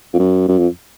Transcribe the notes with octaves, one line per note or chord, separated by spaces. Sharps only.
F2
F#2
F#2
F2